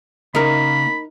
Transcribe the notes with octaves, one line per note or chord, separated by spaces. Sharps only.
C#3 A#3 D#4 A#4 B5